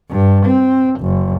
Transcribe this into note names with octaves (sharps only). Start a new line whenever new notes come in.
G2
C4
F#1